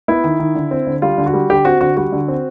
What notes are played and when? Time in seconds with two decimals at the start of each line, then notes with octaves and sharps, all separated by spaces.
0.08 B3 E4
0.24 D#3
0.40 D#3
0.55 D3
0.71 C4
0.87 D3
1.02 G3 F4
1.18 D3
1.26 F#4
1.34 G3
1.50 D3 G4
1.65 C4 F#4
1.81 D3 F#4
1.97 G3 F#4
2.12 D3
2.28 C4